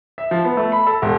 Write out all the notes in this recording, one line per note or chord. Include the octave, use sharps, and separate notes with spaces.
E5
F3
B3
A3
B5
A4
E1